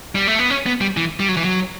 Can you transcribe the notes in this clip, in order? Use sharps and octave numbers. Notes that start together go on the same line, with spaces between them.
G3
A3
B3
C#4
B3
G3
E3
G3
F#3
E3
F#3